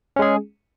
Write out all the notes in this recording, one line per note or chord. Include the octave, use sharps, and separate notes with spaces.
G#3 C#4 G#4